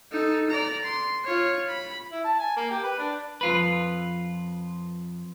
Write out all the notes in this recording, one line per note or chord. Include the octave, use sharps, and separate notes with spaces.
D#4 A4
D5 A#5
C6
F4 C#5
B5
E4
A5
G#5
A#3
G4
B4
D4
F2 F4 B4